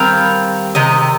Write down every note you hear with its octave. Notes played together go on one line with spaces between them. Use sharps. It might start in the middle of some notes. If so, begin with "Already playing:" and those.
Already playing: D#3 G3 C4 F5
C3 D#3 D#5